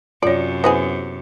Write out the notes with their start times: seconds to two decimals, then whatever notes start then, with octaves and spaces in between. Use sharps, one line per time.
0.23 F#2 C3 F4 C#5 D5
0.64 B3 E4 G#4 C5